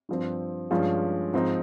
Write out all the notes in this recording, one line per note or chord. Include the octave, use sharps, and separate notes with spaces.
G2 F3 C4
G2 F3 G#3 C#4 F4
G#2 F3 C4 D#4